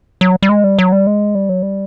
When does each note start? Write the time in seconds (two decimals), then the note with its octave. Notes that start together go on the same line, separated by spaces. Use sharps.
0.21 F#3
0.43 G3
0.49 G#3
0.64 G3
0.79 F#3
0.92 G3
1.07 G#3
1.35 G3
1.49 F#3
1.63 G3